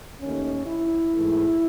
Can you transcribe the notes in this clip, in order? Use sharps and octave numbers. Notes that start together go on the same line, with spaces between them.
D#2 D#3 A3 C#4
E4
G#2 E3 A3